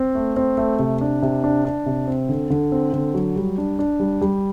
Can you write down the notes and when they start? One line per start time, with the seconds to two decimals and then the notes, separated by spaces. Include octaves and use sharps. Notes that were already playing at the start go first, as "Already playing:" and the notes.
Already playing: C4
0.15 A3
0.36 C4
0.57 A3
0.79 C3
1.01 D4
1.22 C3
1.44 D4
1.65 D4
1.86 C3
2.07 C4
2.29 D3
2.50 D3
2.72 C4
2.93 D3
3.14 F#3
3.36 G3
3.58 D4
3.79 D4
4.00 G3
4.21 G3